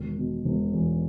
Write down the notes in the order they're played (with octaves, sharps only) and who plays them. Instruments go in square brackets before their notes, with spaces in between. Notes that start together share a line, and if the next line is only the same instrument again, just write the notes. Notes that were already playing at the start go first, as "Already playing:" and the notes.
Already playing: [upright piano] E1 D#3
B2
E1
E2